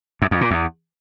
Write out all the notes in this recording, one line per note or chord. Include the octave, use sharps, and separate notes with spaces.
F#2
F2
A#2
E2